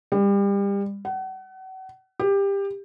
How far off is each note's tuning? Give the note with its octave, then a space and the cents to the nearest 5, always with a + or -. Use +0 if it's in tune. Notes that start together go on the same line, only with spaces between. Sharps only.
G3 +30
F#5 +35
G4 +20